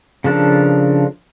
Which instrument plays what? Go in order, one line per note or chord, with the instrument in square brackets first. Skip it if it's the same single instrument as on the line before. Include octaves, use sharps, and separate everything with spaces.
[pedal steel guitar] C#3 F3 D4 A4 A#4